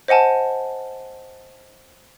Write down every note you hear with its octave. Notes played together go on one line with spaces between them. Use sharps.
C5 D#5 F#5 G#5 A5